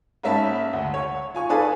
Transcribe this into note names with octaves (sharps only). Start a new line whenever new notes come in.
G#2 A#3 C#4 E5 A5 B5
D2
C#5
F4 G#5 C#6
G#4 A4 B4 D5 F5 G#5